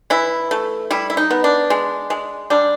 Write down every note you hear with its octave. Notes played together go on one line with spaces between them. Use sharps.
E3 E4
A3
G3 E4
E4
D#4
B3
D4
G#3
G#3
G3 D4